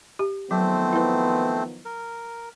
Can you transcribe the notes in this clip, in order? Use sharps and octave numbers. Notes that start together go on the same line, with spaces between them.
G4
D#3 F3 F#3 A3 B3 C4 C5
E4 B4
A#4